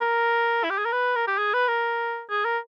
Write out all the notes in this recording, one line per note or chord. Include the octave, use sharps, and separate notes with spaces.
A#4
E4
G4
G#4
A#4
B4
A#4
G4
G#4
B4
A#4
G#4
A#4